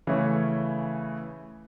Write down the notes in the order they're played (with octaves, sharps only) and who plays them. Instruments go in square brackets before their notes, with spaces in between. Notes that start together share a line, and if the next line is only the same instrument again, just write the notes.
[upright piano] C#3 E3 A3 C#4 E4